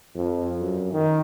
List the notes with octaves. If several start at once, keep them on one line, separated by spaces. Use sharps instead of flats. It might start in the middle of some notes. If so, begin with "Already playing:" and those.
F2
F#2
D#3